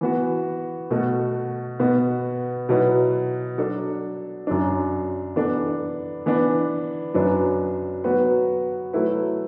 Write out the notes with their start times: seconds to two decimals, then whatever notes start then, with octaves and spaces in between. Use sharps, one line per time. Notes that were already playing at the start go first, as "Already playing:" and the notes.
0.01 E3 B3 F#4
0.91 B2 A3 F#4 A4
1.80 B2 B3 F#4 B4
2.69 B2 F#3 B3 E4 B4
3.58 F#3 D4 A4
4.47 F#2 F#3 D4
5.36 E3 B3 D4 A4
6.26 E3 B3 D4 B4
7.14 F#2 F#3 D4 B4
8.04 F#3 B3 F#4 B4
8.93 F#3 A3 E4 B4